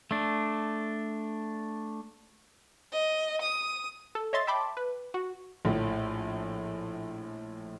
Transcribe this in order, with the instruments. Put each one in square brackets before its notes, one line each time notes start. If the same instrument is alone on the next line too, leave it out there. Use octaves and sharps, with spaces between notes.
[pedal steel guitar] A3 D4
[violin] D#5
D#6
[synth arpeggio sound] A4
C#5 D#5 E5 C6 A6
E5 G5 A5 B5 C6 D6
B4
F#4
[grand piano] A#1 A2